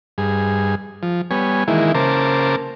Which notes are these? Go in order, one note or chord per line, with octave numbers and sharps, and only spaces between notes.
G2 G#4
F3
G3 B3 C#5 G#5
D#3 E3 G#3 A#3 E4
C#3 A#3 A#4 C5 A5 D6